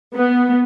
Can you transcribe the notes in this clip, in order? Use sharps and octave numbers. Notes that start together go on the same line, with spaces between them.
B3